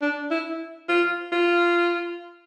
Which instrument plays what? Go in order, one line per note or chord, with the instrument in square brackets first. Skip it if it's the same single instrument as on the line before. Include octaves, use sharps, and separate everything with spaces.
[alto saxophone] D4
E4
F4
F4